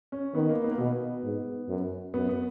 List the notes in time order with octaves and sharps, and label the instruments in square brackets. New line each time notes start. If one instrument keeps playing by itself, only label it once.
[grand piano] C#4
[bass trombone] D#3 [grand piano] B3
[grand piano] A#3
B3
A#3
[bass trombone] B2 [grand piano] B3
[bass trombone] G#2
F#2
[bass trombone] F#2 [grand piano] B3
[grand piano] B3